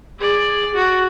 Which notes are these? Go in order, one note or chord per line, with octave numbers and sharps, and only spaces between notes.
G#4 D5
F#4